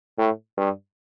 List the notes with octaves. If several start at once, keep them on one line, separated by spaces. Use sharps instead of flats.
A2
G2